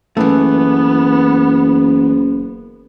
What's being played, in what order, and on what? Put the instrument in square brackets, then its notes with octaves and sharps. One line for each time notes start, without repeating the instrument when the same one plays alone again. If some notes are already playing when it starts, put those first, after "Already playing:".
[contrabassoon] F#1 [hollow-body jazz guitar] E3 A3 [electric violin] B3